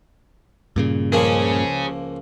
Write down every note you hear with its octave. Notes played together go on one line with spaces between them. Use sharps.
G2 A#2 C#3
C#2 F3 A#3 G#4 C#5